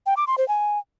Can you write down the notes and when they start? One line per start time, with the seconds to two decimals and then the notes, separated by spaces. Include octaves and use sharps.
0.06 G5
0.17 D6
0.27 C6
0.38 C5
0.48 G#5